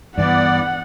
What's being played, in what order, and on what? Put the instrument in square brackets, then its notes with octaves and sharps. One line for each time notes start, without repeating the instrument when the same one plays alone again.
[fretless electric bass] G2 E3 [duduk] B3 [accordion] D5 [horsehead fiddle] F#5